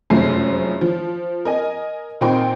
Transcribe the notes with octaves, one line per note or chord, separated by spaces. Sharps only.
F1 F#2 F3 G#3 A3 C7
F3
A#4 D#5 G#5
A#2 C4 D#4 A#4 G5 C6